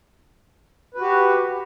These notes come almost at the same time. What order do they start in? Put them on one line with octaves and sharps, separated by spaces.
B4 F#4 G4